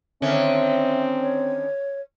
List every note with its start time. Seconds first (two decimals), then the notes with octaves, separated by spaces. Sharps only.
0.22 D3 D#3 C4 C#4 E5
1.21 C#5